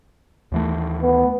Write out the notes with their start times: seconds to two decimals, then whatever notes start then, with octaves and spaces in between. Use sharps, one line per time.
0.52 D#2 E3 A3
1.03 B3